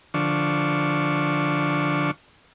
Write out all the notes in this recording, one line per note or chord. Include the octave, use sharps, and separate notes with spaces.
D3 F3 D4 C#6